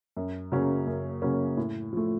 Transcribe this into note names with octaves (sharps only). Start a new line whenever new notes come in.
F#2
C#3 F#3 A#3 C#4
F#2
C#3 F#3 A#3 C#4
A2
F3 A3